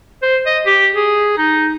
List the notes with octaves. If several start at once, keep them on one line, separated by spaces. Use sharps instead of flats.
C5
D#5
G4
G#4
D#4